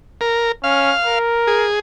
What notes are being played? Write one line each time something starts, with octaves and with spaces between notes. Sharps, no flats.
A#4
C#4 F5
A#4
G#4